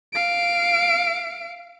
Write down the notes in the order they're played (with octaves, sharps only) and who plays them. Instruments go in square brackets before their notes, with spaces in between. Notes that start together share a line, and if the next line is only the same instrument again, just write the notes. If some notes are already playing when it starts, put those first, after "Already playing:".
[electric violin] F5 D7